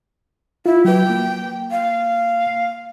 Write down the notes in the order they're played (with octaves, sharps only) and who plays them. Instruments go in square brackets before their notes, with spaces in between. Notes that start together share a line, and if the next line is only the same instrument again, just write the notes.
[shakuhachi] E4 [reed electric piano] F4
[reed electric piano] F#3 B4 [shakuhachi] G5
[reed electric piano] A#3
[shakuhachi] F5